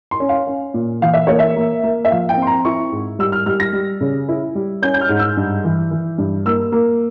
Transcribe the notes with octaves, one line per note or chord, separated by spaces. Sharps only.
C6
C#4
F5
C#4
A#2
E3 F5
E5
A#3 C#5
E5
A#3
A#3
E5
F3 F5
G5
C4
C6
A#5
E4 C#6
G#2
G3 E6
F6
G3 F6
A#6
G3
C#3
E4
G3
C#4 G6
G6
F6
G#2
E6
G2
E3
E3
G2
A#3 E6
A#3